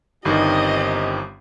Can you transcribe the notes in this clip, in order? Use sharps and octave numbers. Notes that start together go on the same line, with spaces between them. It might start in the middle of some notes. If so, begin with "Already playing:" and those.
G1 G2 D#3 C4 D#4 G4 D#5